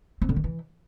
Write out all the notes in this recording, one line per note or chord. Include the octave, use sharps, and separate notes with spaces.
C4
D3
D#3
E3